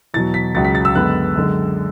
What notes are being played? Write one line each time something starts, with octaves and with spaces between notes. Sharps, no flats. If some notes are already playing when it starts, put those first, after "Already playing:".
E2 B2 F#3 A6
B6
C#2 C#3 F#3 A6
B6
A6
E6
F#2 D3 G#3 B3 F#6
F#2 D3 G#3